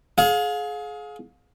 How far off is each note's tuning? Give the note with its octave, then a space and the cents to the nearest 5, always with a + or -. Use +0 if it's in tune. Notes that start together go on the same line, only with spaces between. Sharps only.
G#4 +30 F5 +35